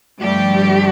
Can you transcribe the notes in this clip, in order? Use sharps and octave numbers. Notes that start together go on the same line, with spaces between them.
G2 D3 F3 G3 A3 G4